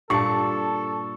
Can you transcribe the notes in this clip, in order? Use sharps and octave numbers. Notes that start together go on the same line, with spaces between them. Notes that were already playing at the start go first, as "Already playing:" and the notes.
G2 A#2 A4 D5 A5 C#6